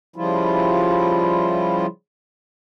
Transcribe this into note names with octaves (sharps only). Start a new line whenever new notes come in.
C#3 F3 G3 E4 F4